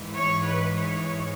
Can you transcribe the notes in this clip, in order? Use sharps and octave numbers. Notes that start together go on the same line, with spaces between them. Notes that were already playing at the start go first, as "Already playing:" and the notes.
Already playing: G#2 E3 G#3
C#5
B4
C#5